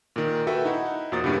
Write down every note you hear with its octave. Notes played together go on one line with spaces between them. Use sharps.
A#2 D#3
F#4 A4 B4 E5 G5
D#4 E4 F#5
E2 A#2 F#4 C5 D#6 A6
G2 A#2 C#3 G3 B3 E4